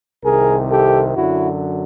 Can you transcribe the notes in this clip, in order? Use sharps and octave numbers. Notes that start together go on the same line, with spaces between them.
C2 C3 D#3 G#4 A#4
G4 A4
F#2 D3 F#3 E4 F#4